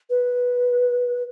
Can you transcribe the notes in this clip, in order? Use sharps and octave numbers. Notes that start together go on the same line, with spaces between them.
B4